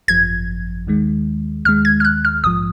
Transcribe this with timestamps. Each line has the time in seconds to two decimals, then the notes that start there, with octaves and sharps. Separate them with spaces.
0.08 G#1 F#2 F3 G#6
0.87 D#2 D#3 G#3
1.65 D#2 D#3 G#3 F6
1.85 G#6
2.00 F6
2.05 F#6
2.25 F6
2.43 A#1 G#2 F3 D#6